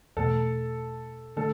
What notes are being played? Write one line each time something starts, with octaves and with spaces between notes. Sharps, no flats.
E2 B2 A3 A4
D3 A3 A4